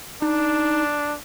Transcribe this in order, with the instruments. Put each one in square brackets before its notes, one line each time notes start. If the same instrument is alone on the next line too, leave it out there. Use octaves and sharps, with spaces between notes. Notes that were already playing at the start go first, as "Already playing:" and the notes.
[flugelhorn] D4 [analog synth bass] D#4